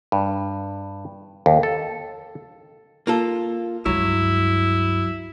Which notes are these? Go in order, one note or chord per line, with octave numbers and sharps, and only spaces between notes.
G2
D#2
A4
A#3 F4 A4
C#2 G2 F#3 E4